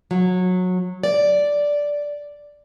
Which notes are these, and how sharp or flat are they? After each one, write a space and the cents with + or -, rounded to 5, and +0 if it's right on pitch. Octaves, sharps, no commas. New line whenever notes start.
F#3 -20
D5 -5